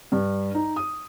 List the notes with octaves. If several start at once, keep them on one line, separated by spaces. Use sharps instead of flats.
G2
D#4
D#6